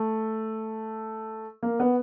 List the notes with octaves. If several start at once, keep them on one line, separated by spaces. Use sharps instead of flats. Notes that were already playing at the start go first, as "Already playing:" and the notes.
Already playing: A3
A#3
B3